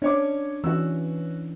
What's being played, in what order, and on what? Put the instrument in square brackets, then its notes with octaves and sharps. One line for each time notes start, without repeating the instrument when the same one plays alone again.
[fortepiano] C#4 C#5 D6 [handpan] D4
[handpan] E3 C#4 [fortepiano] F#4 E6